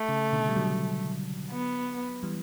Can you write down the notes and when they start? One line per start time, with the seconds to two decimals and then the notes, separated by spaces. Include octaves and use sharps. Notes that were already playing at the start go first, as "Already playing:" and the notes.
Already playing: A3
0.09 C#3
0.33 B2 D3
0.49 G3
0.56 D3 F#3
1.51 B3
2.23 E3 G3